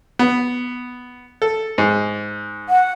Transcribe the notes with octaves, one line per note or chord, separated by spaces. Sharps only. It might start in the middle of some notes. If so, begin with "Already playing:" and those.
B3
A4
G#2
F#5